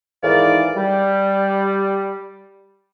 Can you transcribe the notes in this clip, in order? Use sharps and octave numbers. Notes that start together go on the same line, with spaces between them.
F2 G#2 D#3 E3 D5 F5
G3